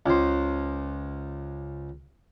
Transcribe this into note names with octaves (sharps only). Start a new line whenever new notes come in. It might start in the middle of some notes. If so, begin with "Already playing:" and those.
C#2 C5